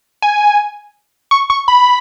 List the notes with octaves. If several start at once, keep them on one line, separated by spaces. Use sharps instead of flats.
G#5
C#6
C#6
B5